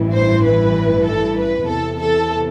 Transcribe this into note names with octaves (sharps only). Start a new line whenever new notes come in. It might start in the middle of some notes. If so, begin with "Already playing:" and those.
Already playing: A1 G2 E3
C5
B4
A4
B4
E2 C3 E3 A4
A4